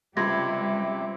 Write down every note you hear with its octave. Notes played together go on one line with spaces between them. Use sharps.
C#2 C3 G3 E5 C6 D6 G#6 A#6